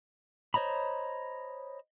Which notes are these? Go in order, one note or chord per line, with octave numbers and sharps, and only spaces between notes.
C5 C#5 D#5 A#5 B5